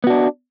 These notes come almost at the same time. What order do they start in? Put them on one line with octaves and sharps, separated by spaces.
B3 F#4 D4